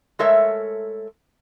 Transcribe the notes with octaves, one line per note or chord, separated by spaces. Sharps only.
G#3 A3 A4 A#4 C#5 E5